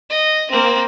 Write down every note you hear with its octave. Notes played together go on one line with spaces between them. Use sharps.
D#5
A#3 C4